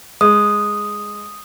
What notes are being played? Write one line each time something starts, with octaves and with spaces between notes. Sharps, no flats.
G#3 D#6